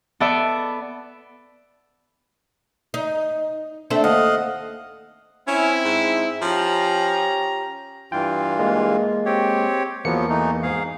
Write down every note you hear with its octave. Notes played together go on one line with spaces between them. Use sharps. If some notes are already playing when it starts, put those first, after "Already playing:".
B3 A4 D5 E5
D#4
A3 C4 D4
D#2 D#5 F5 F#5
C4 C#4 E4
G#2
F3 C#4 G4 A#5
G2 E3 F4 G5
G#3 A#3
C4 G4 C#5
E2 F3 F#3 A#3 B3 C#7
E3 A3 D#4
G#2 G#4 F5